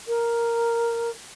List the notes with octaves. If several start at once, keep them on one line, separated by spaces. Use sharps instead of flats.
A#4